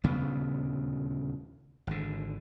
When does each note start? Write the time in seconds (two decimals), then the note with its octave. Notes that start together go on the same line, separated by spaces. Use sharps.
0.04 D#1 D2 C#3 B3
1.87 G#1 D3